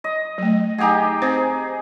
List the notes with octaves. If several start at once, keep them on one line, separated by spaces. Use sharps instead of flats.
D#5
F#3 A3
D#4 G4 G#4 F#5 G#5
C4 G#4 C5